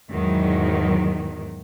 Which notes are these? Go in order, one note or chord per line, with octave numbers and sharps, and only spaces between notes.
E2 G#2 D#3 F#3